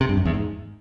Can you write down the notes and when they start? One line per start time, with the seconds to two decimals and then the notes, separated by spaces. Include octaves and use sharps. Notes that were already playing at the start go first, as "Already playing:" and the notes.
0.01 C3
0.09 G2
0.17 F#2
0.25 E2
0.34 G#2